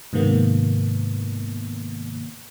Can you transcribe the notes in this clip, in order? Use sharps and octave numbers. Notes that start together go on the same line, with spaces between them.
G#2 C3 D#3 A#3 B3